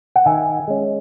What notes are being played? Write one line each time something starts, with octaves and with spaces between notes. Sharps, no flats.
F#5
D#3 E5 G#5
G#3 C#4